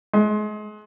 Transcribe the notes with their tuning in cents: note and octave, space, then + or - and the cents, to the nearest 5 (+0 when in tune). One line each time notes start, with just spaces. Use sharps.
G#3 +35